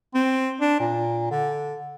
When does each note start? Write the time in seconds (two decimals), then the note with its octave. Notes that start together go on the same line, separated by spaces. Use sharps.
0.15 C4
0.61 D4
0.80 A#2
1.31 D3